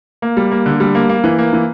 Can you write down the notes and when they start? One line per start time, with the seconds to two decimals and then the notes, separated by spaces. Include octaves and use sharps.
0.22 A#3
0.37 G3
0.51 A#3
0.66 D3
0.80 G3
0.95 A#3
1.09 A#3
1.24 E3
1.39 A#3
1.53 E3